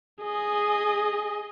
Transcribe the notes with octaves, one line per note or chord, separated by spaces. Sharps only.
G#4 D#5